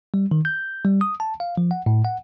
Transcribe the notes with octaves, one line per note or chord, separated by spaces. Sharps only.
G3
D#3
G6
G3
D#6
A5
F5
F3
F#5
A2
F#5